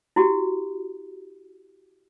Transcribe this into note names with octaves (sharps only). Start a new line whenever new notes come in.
E4 F#4 G4